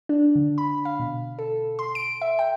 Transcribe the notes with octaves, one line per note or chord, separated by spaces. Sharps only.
D4
D3
B5
F5
B2
A4
C6
D7
E5
G5